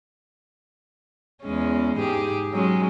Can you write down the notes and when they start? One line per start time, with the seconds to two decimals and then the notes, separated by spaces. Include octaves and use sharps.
1.43 E2 G#3 C#4
1.98 G#2 G4 G#4
2.53 F#3 G#3 C#4